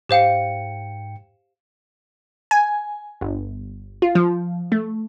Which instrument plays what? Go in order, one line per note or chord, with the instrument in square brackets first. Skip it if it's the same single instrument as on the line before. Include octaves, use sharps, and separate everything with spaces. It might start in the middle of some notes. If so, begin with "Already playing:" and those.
[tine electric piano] G#2 G5 C#7 [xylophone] G4 C5 F5
[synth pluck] G#5
G1
F4
F3
A3